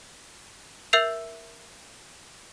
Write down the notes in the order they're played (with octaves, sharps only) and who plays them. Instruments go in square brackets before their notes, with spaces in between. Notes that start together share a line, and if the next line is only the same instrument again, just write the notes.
[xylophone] A#4 E5 E6 G6 C7 F7